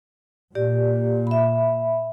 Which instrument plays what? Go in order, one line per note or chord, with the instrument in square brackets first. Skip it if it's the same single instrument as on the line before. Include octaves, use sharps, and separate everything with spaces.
[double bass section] A#2 [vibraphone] G4 D5
[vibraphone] E5 B5